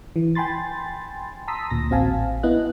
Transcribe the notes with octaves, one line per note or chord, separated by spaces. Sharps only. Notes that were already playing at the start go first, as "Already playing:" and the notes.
E3
G5 G#5 B5 C6 A6
A5 A#5 C6 D#6 E6 B6
D2 A#2 A#6
A1 C4 F#4 F5 G#5 A5
B3 E4 D#5 F#6